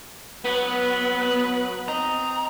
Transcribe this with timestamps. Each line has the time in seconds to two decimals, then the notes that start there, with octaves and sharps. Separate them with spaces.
0.45 F#3 B3 B4
1.88 C4 D#5 A#5